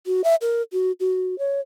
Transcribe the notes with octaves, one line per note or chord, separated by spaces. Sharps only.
F#4
E5
A#4
F#4
F#4
C#5